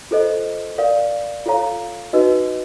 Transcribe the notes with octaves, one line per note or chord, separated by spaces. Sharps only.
F4 A4 C5 D#5
A#4 D5 F5
F4 A4 C#5 F5 A#5
D#4 F#4 B4 D#5